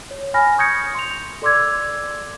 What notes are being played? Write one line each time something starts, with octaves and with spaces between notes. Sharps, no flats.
C#5
G#5 B5 F6 A#6
C#6 D#6 G6 G#6 A#6 C#7
C6 F7
A4 D5 C6 D6 E6 G#6